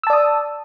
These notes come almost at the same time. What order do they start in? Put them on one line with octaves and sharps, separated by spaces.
E6 A5 D5 D#6